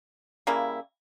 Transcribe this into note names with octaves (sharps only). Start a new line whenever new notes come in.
C#3 G3 A#3 E4